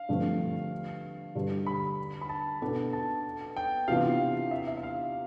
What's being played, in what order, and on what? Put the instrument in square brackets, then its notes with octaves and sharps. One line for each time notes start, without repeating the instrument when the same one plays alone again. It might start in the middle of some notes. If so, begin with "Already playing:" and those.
Already playing: [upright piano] F5
[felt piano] G2 D3 F3 A3 C4
G2 D3 G3
[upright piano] B5
B5
A5
[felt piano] B2 B3 D4 A4
[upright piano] A5
G5
[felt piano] C3 E3 B3 D4 F4 [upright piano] F5
[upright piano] E5
E5
E5
F5